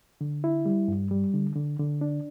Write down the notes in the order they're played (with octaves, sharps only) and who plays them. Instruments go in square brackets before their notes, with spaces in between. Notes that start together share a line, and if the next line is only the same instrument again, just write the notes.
[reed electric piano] D3
E4
G3
G2
G3
D3
D3
D3
D4